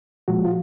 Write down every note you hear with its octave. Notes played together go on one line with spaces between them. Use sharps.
A#2 F3 G#3 F#4
F4